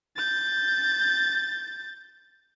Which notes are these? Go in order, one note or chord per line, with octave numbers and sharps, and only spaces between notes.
G6 A6